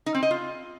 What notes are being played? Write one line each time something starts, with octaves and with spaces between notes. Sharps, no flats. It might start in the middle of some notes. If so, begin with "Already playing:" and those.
D#4
C4
D#5
F4